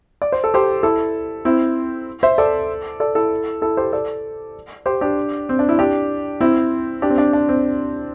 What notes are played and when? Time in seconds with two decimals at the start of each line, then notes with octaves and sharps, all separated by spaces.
0.22 D5
0.32 C5
0.44 A4
0.54 G4 C5
0.83 E4 A4
1.45 C4 E4
2.23 C5 E5
2.38 A4 D5
3.00 A4 D5
3.15 E4 A4
3.62 E4 A4
3.77 G4 C5
3.93 A4 D5
4.86 G4 C5
5.01 D4 G4
5.49 C4
5.59 D4
5.69 E4
5.79 D4 G4
6.41 C4 E4
7.02 D4 G4
7.10 C4
7.18 D4
7.33 D4
7.49 C4